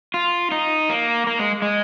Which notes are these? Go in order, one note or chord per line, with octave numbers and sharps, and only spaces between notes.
F4
D#4
A#3
A#3
G#3
G#3